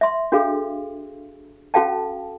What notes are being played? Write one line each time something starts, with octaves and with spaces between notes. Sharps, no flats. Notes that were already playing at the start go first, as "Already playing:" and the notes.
E5 C6
D4 F#4 G#4 A4 F5
C#4 F#4 A4 F5 G5 A5